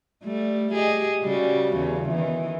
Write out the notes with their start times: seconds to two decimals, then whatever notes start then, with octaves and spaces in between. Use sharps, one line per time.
0.23 G3 A3
0.72 G4 G#4 D#5
1.23 C#3 G3 F#4
1.75 E2 C#3
2.10 D#3 E3